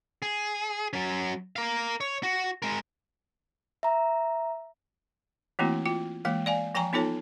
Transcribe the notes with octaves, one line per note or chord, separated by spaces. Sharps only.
G#4
F#3 C#4
A#4 F5
C#5
F#4
G#3 A#4
E5 A#5
E3 A3 A#3 C4 E4 F#4
F4 G5
E3 G#3 A#3 G5
D5 F5 G#5
F3 G5 G#5 A#5 C#6
B3 D#4 F4 A4 C#5 A5